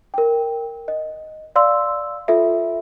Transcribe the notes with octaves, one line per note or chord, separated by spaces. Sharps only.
A#4 G5
D#5
D5 F5 C6 E6
F4 A4 E5